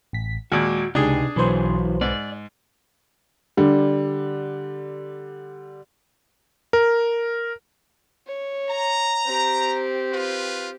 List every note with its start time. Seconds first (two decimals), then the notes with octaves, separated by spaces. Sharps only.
0.13 A1 B6
0.52 D#2 A#2 G#3 F#4
0.95 C#2 C3 D4 D#4 G4 G#4
1.36 B1 E3 F#3 B4 C5
2.01 G#2 D5
3.57 D3 G3
6.73 A#4
8.27 C#5
8.70 A#5
9.26 C4 G4
10.13 F4 B4